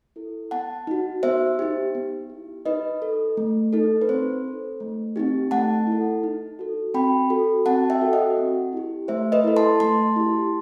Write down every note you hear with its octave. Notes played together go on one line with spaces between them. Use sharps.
E4 A4
B3 F#5 A5
D#4 F#4
B3 C5 E5
D#4 G4
B3
E4 G4
D#4 B4 D#5
A4
A3
D#4 A4
B4
C4 C5
D#4 A4
A3
C4 D#4 G4
A3 F#5 A5
E4 A4
D#4
F#4 A4
C4 G5 B5
F#4 A4
C4 F#5 A5
E5 G5
F#4 A4
D#5 F#5
C4
E4 G4
A3 C5 E5
B4 D#5
E4 A4
A5 C6
A3 A5 C6
E4 G4